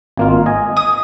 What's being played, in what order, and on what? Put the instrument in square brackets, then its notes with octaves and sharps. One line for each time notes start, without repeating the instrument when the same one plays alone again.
[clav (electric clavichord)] G#1 A#3 F4
D#5 G#5
[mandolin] D#6